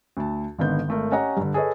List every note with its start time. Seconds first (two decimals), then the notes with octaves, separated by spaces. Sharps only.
0.17 D2 A5
0.58 G#1 D3 D#3 B3 G6
0.88 G#1 A3 A#4
1.12 C#4 G4 C#5 D#5 F#5 A#5
1.37 G2 D3
1.54 G#4 A4 B4 C#5 D#5